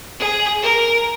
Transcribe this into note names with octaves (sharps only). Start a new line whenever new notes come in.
G#4
A#4